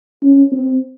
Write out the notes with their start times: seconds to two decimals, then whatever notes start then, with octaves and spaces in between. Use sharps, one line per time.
0.23 C#4
0.52 C4